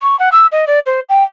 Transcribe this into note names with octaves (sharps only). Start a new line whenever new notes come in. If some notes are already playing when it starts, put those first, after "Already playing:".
C#6
F#5
E6
D#5
D5
C5
G5